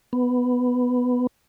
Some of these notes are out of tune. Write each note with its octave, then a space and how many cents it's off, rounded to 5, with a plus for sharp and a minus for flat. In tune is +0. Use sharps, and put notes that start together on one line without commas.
B3 +5